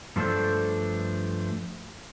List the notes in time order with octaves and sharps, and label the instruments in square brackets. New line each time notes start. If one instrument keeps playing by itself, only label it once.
[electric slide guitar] G2 F3 A3 D4 A4 C5